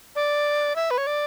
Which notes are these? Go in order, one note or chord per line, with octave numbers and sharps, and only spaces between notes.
D5
E5
B4
C#5
D5